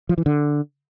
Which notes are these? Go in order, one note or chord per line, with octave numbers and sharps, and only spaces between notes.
F3
E3
D3